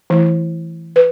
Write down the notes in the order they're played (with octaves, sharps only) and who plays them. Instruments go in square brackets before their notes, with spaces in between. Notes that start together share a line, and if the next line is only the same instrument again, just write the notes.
[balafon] E3 A3 E4
B4